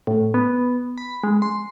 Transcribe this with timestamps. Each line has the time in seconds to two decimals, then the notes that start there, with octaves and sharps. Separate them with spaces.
0.07 A2
0.34 B3
0.98 B5
1.23 G#3
1.42 C6